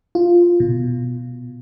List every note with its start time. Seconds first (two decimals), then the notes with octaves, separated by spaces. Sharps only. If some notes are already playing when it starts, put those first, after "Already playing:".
0.15 F4
0.60 B2